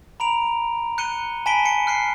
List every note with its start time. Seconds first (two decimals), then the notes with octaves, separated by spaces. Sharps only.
0.20 A#5 B5 D7 F7
0.98 F#6 C#7 D#7 G7
1.46 G#5 A5 B5 B6 D7 G7
1.65 G#5 C#7
1.87 F6 F#6 C7 C#7